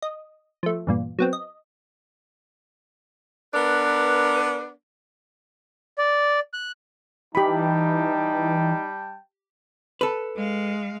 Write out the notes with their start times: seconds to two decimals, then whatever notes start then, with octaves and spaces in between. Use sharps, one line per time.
0.02 D#5
0.63 F3 A3
0.87 E2 G2 A#2
1.19 F#3 B3 C4
1.33 D#5
3.54 B3 D4 A#4 B4
5.98 D5
6.53 F#6
7.35 E3 G3 D#4 G4 G5 A5 B5
10.01 A4 B4
10.36 G#3 F5